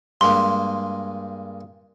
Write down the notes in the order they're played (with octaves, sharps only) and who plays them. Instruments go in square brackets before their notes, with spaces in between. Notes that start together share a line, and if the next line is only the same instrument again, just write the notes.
[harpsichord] G2 G#3 A#3 [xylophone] C6